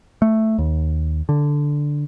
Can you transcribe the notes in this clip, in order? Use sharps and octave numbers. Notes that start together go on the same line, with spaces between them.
A3
D#2
D3